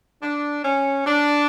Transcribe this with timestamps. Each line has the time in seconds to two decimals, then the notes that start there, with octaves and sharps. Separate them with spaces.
0.23 D4
0.65 C#4
1.06 D4